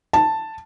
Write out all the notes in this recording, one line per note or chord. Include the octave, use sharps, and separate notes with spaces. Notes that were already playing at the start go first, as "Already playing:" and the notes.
A5